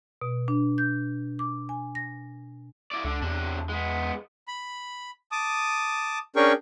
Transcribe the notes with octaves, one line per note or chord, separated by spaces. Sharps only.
B2
D4
G6
D6
G#5
A#6
E4 D5
C#2 D3 D4
E2 C3 D4
G#3 B3
B5
A5 D6 D#6
C#4 D4 G#4 A#4 G5 C#6